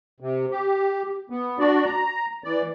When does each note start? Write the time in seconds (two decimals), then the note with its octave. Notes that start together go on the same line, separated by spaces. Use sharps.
0.20 C3
0.51 G4
1.30 B3
1.59 D4 F#4 D5
1.85 A#5
2.44 E3 D5